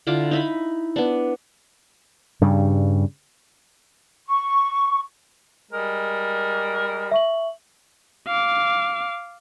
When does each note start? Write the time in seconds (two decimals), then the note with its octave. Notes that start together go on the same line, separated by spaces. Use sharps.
0.07 D3 E4 F4 D6
0.31 D#4 E4 B5
0.96 B3 D4
2.41 G2 C#3 G3
4.28 C#6
5.72 G3 G#3 A#4
7.11 E5 C#6 F#7
8.27 F5 D6